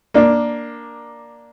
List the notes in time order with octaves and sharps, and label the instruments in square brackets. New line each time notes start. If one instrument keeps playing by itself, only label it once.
[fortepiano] A#3 D4